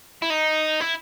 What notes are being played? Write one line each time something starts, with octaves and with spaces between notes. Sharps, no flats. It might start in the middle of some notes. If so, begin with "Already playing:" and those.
E4
D#4
E4